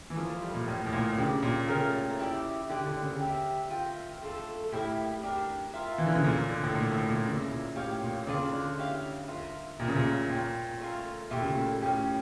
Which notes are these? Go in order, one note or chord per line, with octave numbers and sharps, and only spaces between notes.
E3
F3 A3 D4 F4 A#4
G3
A#2
A2 A#3 C#4 E4
A2
A#2
A#2
C#3 D4 G4 D5
A#2
C#3 A3 C#4 G4 A#4
E4 G4 D5
D3 C#4 G4 D5 G5
D3
C#3
G4 A#4 E5
F4 A#4 E5 G5
A3 D4 F4 A4
A2 A#3 E4 G4
D4 G4 A#4
F4 A#4 E5
E3
D3
C#3
A#2 D4 F4 A4
D3
A2
A#2 D4 A4 E5
A2
A#2
C#3 E4 A#4 D5
A#2
A2 G4 C#5 F5
A#2
C#3 D4 F4 A#4 D5
D3
E4 G4 C#5 F5
F4 A#4 E5
A#2 G4 A#4 E5
C#3
A#2
A#2 F4 C#5 G5
A3 C#4 F4 A#4
A#2 A3 E4 G4
C#3
A#2
A2 C#4 E4 G4